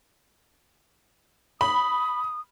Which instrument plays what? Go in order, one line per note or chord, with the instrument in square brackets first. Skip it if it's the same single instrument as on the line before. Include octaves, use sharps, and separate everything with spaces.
[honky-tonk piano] B5 [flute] D#6